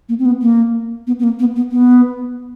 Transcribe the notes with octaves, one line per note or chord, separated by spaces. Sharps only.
A#3
C4
B3
A#3
B3
B3
A#3
B3
B3
B3